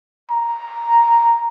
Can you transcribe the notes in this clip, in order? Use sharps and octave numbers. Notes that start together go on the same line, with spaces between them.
A#5